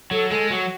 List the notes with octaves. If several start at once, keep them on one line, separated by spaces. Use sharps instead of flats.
F#3 A4
G#3 A4
F#3 F#4